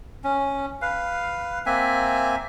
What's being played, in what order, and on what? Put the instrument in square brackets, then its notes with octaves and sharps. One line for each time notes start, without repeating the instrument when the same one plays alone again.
[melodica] C#4
B4 F5
A#3 C4 E5 G#5